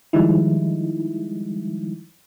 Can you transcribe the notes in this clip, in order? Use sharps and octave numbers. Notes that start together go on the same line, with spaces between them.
D#3 F3 G3 G#3 D#4 E4